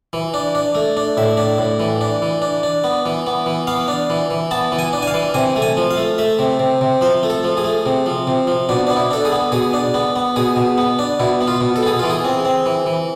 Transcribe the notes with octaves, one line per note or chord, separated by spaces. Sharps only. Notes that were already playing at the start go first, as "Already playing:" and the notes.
E3
D4
D4
A3
D4
A2 E5
D4
A2
E3
D4
E3
D4
D4
B3
E3
B3
E3
B3 F5
D4
E3
E3
B3 A5
E3
G#5
D4
G#5
F5
E3
C3 G#5
A3
G#5
F3
F5
A3
A3 E5
C3
C3
C3
F3 C5
A3
A4
F3
G#4
A3
C3
F3
C3
F3
B2 D4
D4
B3
E4
D4 A4
G#4
B3
B2 G#4
D4
B3
B3
B2 G#4
B2
B3
D4
B2 E4
B3
F4
B2
A4
B3 G#4
E3 F4
G#4
C4
C4
E3
E3